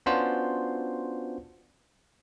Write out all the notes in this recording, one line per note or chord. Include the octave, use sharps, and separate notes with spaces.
B3 C#4 D4 F4 F#4 C5